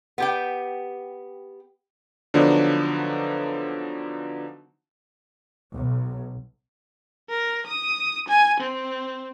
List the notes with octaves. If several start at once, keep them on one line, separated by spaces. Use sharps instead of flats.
B3 G4 G5
D3 F3 F#3 B3 D4 D#4
B1
A#4
D#6
G#5
C4